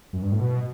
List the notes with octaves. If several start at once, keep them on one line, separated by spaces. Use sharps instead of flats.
F#2
G2
A2
B2